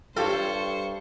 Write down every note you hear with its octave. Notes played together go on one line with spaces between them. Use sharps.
G2 F4 G4 A4 C5 C#5 C#6